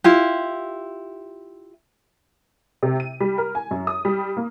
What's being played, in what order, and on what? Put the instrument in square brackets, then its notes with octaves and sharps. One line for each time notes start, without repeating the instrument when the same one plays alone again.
[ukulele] E4 F4 G4
[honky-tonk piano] C3
D#7
G3
A#4
G#5
F#2
D#6
G3
A#3